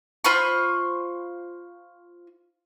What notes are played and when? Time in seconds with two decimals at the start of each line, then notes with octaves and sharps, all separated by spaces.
0.25 F4 C5 B5 C#6